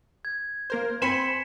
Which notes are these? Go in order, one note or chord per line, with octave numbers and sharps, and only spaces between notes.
G#6
A#3 A#4 C5
C4 G#5 B5 C6 B6 C#7 E7